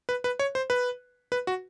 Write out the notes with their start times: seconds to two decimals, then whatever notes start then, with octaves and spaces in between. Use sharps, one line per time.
0.09 B4
0.24 B4
0.39 C#5
0.55 C5
0.70 B4
1.32 B4
1.47 F#4